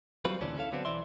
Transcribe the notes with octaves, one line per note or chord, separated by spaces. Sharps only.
F#3 G3 C4 F4 B4
D2 A#2 C#3 E3 C#4 D4
C#4 E4 A4 F5
D3 F#3 B3 C4 D4
B1 E3 D5 E5 C6